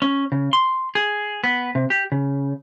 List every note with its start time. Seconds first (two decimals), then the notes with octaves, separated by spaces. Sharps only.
0.02 C#4
0.32 C#3
0.53 C6
0.95 G#4
1.44 B3
1.75 C3
1.90 G4
2.12 C#3